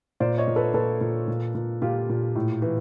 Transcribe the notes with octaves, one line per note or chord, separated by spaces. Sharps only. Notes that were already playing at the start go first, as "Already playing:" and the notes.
A#2 C5 D5
C#5 D#5
A#2
A4 B4
A#2 A4 B4
A#2
A#2
A#2
A#2 F4 G4
A#2
A2
E3